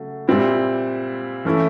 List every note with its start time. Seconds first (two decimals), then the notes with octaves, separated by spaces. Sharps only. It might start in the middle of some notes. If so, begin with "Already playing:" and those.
Already playing: C#3 F#3 A3
0.28 A#2 G3 C4 E4
1.45 E3 A3 C#4 E4